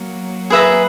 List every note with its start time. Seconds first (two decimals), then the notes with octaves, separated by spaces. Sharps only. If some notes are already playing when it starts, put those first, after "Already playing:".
Already playing: F#3 A#3
0.50 G#4 B4 E5 A#5